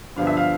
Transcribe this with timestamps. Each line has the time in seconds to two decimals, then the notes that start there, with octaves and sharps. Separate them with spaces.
0.16 G2 D3 F3 B3 F5
0.27 E5
0.37 F5